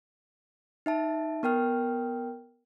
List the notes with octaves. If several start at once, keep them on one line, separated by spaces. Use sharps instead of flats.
D#4 E5 A5
B3 A#4 G5 F6